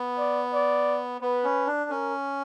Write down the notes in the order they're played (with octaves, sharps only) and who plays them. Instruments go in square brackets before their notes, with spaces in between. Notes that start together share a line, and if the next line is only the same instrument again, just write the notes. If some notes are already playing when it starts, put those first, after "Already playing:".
Already playing: [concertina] B3
[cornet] D5
D5
[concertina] B3 [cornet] B4
[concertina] C#4
D4
[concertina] C#4 [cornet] A#4